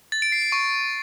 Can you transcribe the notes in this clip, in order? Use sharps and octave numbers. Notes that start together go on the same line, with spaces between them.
A6
D7
C7
D7
C#6